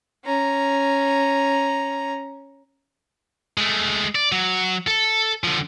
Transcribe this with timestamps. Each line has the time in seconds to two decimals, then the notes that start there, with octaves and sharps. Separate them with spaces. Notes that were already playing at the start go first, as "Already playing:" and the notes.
0.24 C#4 A#5
3.58 G#3 A3
4.15 D5
4.32 F#3
4.87 A4
5.44 D3 F3